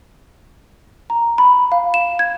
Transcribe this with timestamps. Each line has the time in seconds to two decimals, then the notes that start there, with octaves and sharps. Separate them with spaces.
1.10 A#5
1.38 B5
1.72 F5
1.94 E7
2.19 G#6